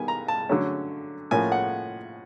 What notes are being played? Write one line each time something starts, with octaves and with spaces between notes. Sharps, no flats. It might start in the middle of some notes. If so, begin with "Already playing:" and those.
Already playing: D#3 G3 B3 G#5
A#5
A5
D3 F#3 A3 C#4
A2 F3 A#3 C#4 G#5
F#5